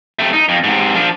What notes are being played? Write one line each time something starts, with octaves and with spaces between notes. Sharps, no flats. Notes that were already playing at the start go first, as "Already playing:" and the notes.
C3 A3
D#4
F2
G#2 C3
F3 D4